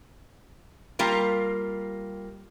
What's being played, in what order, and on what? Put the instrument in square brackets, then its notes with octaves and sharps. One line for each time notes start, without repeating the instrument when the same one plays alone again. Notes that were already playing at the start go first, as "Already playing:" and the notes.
[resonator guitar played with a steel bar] G3 A#3 F4